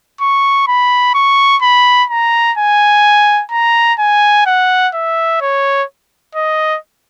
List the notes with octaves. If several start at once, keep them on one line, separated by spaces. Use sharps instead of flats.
C#6
B5
C#6
B5
A#5
G#5
A#5
G#5
F#5
E5
C#5
D#5